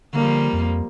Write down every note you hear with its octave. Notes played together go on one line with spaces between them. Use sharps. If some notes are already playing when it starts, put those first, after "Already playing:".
D3 F3 G3 A#3
F2